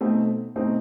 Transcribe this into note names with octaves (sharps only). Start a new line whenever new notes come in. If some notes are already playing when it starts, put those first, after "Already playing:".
B2 A3 C4 D#4
B2 A3 C4 D#4